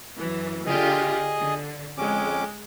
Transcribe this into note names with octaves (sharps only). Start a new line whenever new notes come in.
F#2 E3
D3 F4 G4 G#4 D#5
D3
F2 G#3 C#4 D6